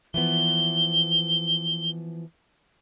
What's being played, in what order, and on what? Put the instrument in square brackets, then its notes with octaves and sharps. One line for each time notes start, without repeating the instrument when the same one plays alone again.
[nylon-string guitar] E3 F3 B3 [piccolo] G7